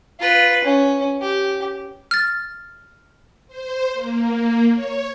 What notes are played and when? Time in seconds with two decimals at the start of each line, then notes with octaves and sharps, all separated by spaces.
0.20 F4 B4
0.65 C#4
1.21 G4
2.11 F6 A6
3.48 C5
3.94 A#3
4.73 C#5